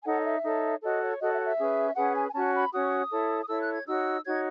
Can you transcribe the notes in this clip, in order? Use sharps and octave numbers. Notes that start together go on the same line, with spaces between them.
G#5
D#4 A4 C#5 F#5
D#5
E5
D#4 A4 C#5
F#4 A4 C#5 D#5
C#5
F#4 A4 C#5 D#5
E5
F#5
E5
C#4 G#4 B4
C#4 G#4 B4 F#5
G#5
G#5
C#4 F#4 C#5 A5
B5
C#4 F#4 C#5 D#6
E4 A4 C#5
D#6
E4 A4 C#5 E6
F#6
G#6
D#4 F#4 C#5 E6
D#4 F#4 C#5 G#6